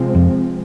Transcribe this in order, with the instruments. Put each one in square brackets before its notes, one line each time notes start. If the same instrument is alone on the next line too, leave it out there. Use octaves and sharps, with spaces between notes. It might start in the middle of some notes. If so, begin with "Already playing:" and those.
Already playing: [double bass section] C3 F3 G#3 C4
[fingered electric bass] F2